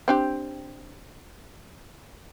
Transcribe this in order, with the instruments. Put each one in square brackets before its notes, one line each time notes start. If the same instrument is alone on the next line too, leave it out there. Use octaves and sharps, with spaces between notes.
[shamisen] C4 D4 G4